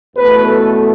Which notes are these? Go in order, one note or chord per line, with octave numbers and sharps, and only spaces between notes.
E2 B2 A3 B4
A4